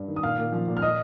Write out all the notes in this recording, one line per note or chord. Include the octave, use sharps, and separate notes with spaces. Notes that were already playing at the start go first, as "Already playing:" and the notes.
Already playing: G2
D#3
D#6
A#2 F5 F6
A#2
F3
A#2
F6
D#5 D#6